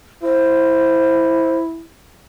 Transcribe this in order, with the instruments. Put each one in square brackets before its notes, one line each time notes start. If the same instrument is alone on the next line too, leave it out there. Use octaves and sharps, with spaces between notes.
[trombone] E4 [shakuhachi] C5